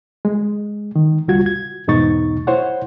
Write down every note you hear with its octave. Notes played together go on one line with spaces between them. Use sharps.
G#3
D#3
C#2 G3 F4 F#4 G#6
G#6
E2 G#2 B2 D#4 C#6 A6
E4 C5 C#5 F#5